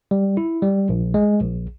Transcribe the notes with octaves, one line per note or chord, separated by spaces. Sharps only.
G3
E4
G3
A#1
G#3
A#1